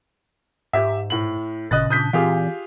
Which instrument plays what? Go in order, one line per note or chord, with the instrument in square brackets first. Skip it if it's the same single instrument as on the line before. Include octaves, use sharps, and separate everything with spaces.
[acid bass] G#2 [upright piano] G4 E5
[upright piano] A2 F#7
[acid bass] G#1 [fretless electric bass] A#2 C#3 [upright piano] D#5 F#6 A6
[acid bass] D4 [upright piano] D#6 G6 B6
[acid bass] A#2 [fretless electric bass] E3 C4 [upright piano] F4 G4 G#4